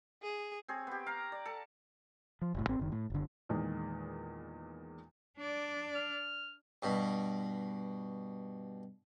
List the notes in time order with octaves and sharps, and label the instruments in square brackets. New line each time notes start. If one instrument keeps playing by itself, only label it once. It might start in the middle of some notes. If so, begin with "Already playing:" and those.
[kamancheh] G#4
[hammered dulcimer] C4 G#4 C#5
B3 G4
F5 A#5
D5
A4 A5
[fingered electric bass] F3
F1 A2
G#1 C4
F#1 D#3
A2
F#1 D3
[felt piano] E2 A#2 D#3 G#3
[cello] D4 D5
[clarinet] F6
[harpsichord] G2 B2